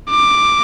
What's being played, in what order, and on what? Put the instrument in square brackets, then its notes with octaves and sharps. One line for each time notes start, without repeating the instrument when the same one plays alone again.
[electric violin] D6